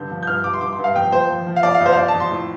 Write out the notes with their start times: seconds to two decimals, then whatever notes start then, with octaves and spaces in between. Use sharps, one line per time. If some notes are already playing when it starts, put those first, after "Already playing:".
Already playing: G2 D3 G6
0.10 F3
0.23 G6
0.27 G2 F6
0.44 G2 D6
0.53 C6
0.61 G2 D6
0.73 C6
0.78 G2
0.84 F5
0.95 F2 G5
1.12 F2 C5
1.30 F3
1.46 F3
1.56 F5
1.63 F2 D5
1.75 F5
1.80 F2
1.86 C5
1.92 F5
1.97 F2 D5
2.08 A5
2.14 F2
2.20 C6
2.31 A2